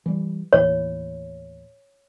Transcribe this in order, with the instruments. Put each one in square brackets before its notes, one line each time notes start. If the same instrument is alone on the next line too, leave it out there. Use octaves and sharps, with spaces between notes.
[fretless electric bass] E3 G3
[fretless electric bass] D#2 A2 E3 [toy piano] C#5